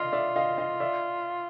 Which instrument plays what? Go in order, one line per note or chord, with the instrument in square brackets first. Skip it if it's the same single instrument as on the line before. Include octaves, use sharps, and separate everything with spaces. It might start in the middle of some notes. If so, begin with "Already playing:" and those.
Already playing: [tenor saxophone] F4 [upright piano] D5 D#5 F5
[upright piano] D5 E5
D#5 F5
D#5 F5
D5 E5